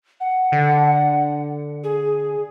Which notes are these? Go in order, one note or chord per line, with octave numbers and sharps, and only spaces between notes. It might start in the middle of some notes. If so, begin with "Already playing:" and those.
F#5
D3
G#4